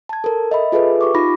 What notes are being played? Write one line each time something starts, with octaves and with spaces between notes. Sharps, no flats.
A5 G#6
A4 A#4
D#5 E5 B5
F4 G#4 A4 B4 E5
G4 C#6 D6
D#4 F4 B5 A#6